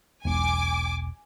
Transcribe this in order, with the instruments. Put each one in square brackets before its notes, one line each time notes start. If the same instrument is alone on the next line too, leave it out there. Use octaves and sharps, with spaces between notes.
[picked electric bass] E1 B1 [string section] G#5 D6